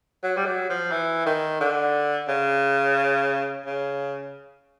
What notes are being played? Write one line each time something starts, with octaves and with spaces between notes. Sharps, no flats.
F#3
G3
F#3
F3
E3
D#3
D3
C#3
C#3